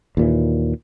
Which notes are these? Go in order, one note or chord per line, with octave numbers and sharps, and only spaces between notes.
D#2 A#2 E3